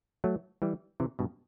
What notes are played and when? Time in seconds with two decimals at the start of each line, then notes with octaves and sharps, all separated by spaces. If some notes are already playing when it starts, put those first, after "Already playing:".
0.24 F#3 A3
0.62 E3 G3
1.00 C3 E3
1.19 G2 B2